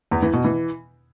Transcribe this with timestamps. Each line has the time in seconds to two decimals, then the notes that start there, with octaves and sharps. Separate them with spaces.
0.11 E2
0.22 E3
0.33 B2
0.44 E3